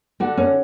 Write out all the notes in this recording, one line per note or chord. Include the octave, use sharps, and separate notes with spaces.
D3 F#4
C#4